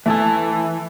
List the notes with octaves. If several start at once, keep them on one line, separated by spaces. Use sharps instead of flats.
E3 A3 G#5 A5 E6